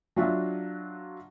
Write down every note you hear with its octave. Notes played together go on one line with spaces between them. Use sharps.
F#3 D4 F4 F#4 E5 F5